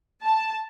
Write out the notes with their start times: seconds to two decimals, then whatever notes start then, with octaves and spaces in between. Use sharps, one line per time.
0.22 A5